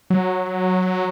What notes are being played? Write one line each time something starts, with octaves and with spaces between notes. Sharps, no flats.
F#3